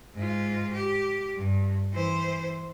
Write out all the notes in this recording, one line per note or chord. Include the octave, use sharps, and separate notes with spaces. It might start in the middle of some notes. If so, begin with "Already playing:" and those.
G#2 F4
G4
G2
E3 C5